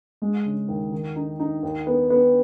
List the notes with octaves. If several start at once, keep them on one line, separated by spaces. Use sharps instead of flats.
G#3
C#3
D#2
D#3
D#4
D#4
D#2
B3
B3